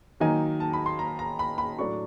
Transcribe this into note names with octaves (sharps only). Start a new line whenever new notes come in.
D#3 F#3 A#3 D#4 G#5
A5
B5
C6
A#5
A#5
B5
B5
A2 F#3 A3 D4 C#6